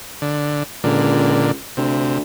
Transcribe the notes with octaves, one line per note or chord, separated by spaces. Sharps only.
D3
C#2 A#2 D3
D2 C3